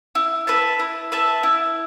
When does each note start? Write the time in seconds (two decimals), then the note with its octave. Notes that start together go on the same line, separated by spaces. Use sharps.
0.15 E4
0.47 B4 E5 A5
0.79 E4
1.12 B4 E5 A5
1.43 E4